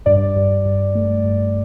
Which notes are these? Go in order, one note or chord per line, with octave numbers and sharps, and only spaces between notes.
G2 D5
G2
G2
A3
G2